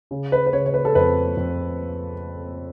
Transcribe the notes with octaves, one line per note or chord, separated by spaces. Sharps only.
C#3
B4
B4
C#3 C#5
C#5
B4
A4
F2 B4
F2